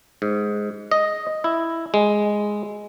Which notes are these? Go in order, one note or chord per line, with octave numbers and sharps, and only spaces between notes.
G#2
D#5
E4
G#3